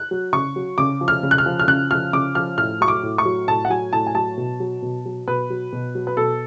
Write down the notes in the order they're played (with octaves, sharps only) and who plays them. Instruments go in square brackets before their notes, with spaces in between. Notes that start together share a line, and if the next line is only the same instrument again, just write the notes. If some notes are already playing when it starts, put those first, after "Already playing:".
Already playing: [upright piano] F#6
F#3
C#3 C#6
F#3
C#3 D6
F3
F6
C#3
F#6
F6
F3
F6
C#3 F#6
F3 F6
C#3 D6
F3 F6
A2 F6
F#3 C#6
D6
A2
C#6
F#3
A2 A5
F#5
F#3 G#5
A2 A5
G#5
F#3 A5
B2
F#3
B2
F#3
B2 B4
F#3
B2
F#3
B4
B2 A4